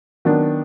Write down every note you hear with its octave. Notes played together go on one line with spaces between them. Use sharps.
D#3 F#3 B3 D4